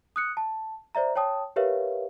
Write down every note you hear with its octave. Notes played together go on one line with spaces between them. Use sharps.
D#6 F#6 C#7
A5
C5 D5 E5 A#5
C#5 G5 A5 D#6
G4 A#4 B4 C#5 E5 F5